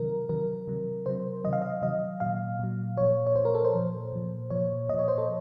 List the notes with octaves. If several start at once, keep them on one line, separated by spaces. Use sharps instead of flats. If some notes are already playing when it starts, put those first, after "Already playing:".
Already playing: C3 D#3 F#3 A#4
C3 D#3 F#3 A#4
C3 F#3
C3 F#3 C5
C3 D#3 F#3 D#5
F5
D#5
C3 D#3 F#3 D#5
A#2 F#3 F5
A#2 F#3
A#2 F3 C#5
C#5
A#2 F3 C5
A#4
A4
C5
A#2 F3
A#2 F3
A#2 F3 C#5
A#2 F3 D#5
C#5
C5
A4